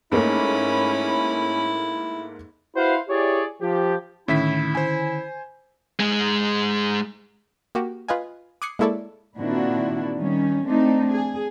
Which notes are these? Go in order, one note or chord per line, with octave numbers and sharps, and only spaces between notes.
G#2 A3 A#3 C#4 E4 B5
E4 F#4 B4 C5 F5 F#5
E4 G4 G#4 C#5 D5
F3 G4
A2 D3 D#3 C#4 E4 E5 B6
C5 G#5
G#2 G#3
A#3 F#4 G4
F4 B4 D#5 F5 G#5
D6 D#6 F#6 G#6 C7 C#7
G#3 A#3 E4 A4 C#5 D5
A#2 D#3 C4 D4 E4 F#4
D#3 G3 C#4
A3 C4 D4 D#4
G#4